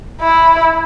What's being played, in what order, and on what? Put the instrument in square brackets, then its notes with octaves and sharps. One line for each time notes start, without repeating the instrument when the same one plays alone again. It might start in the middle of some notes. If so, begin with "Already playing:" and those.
[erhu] E4